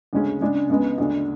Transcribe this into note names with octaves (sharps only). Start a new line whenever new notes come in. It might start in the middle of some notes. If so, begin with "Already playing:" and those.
D2 C#3 G#3 C#4 G#4
C#3 G#3 D4
C#2 C#3 G#3 B3
D2 C#3 G#3 D4